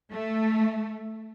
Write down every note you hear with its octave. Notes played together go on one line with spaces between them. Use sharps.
A3